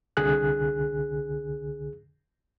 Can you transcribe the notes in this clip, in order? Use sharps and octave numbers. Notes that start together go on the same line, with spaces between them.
C2 D3 G#4 F#6